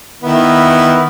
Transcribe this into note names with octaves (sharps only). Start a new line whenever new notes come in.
D#3 B3 E4